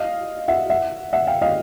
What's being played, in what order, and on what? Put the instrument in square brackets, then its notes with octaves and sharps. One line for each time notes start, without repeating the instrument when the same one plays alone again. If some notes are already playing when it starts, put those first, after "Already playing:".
Already playing: [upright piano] D#5 F5
E5 F#5
E5 F#5
E5 F#5
F5 G5
D#5 F5